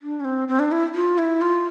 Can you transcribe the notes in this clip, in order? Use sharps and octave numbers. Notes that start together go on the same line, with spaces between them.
D4
C#4
C4
C4
D4
E4
F4
E4
F4